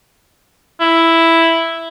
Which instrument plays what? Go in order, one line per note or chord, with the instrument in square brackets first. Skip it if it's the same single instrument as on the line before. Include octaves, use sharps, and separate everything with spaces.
[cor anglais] E4